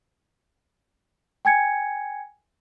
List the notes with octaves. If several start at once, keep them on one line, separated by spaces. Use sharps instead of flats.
G5 G#5 G#6 C#7